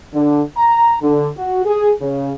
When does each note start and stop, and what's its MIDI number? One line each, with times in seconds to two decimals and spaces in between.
0.14 0.41 50
0.56 0.96 82
1.02 1.28 50
1.37 1.63 66
1.65 1.91 68
2.01 2.32 49